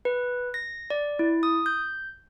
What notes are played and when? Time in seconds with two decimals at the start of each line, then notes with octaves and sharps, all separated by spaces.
0.05 B4
0.54 A#6
0.90 D5
1.19 E4
1.43 D#6
1.66 G6